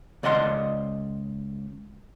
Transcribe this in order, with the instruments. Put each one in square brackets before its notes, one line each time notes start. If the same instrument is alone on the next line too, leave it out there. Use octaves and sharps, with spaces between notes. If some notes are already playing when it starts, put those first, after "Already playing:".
[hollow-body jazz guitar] C#2 D5 D#5 F#5 C6